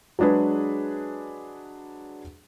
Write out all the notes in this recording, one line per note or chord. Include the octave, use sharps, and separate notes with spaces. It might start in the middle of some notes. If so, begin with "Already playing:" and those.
F#3 G#3 D4 G#4 B4